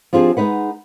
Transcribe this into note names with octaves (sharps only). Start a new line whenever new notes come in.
F3 C4 D4 F4 G4 G#4
G#3 D#4 B4 F#5